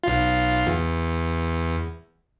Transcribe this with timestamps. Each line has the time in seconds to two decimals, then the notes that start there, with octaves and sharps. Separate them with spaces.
0.04 B1 F4
0.67 E2